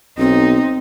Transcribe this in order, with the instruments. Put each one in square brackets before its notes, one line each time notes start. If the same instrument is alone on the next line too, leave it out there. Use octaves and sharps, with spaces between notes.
[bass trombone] B1 [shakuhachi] C4 [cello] D#4